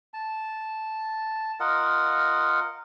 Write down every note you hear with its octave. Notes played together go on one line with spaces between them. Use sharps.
A5
F4 A#4 D#5 F#5